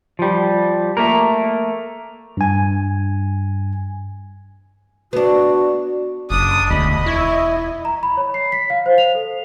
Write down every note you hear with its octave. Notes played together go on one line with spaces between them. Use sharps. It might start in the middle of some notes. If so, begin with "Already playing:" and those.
F3 G3
A3 A#3 A#4
G2 G#5
B3 D4 F#4
F#1 D4 D#6
E1 D2 D#5 B5
E4 C#5
A#5
B5
C#5
C7
B6
F5
C5
F7
A4